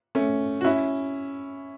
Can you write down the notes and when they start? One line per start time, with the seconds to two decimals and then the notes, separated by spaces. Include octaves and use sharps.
0.15 A3 C#4
0.61 F#4
0.64 C#4 E4